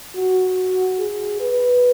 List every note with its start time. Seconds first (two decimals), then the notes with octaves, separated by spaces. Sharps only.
0.15 F#4
0.98 G#4
1.40 B4